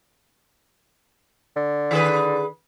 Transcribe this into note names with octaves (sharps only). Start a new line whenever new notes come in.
D3
D#3 G#4 B4